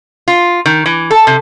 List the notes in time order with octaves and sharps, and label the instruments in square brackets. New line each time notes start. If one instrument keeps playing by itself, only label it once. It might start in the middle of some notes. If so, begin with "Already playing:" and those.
[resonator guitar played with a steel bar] F4
D#3
E3
A4
C3